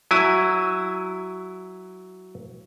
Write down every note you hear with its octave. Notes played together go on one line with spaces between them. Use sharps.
F#3 E4 G#5